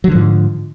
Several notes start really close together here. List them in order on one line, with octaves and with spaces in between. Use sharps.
F#3 D3 F3 G#2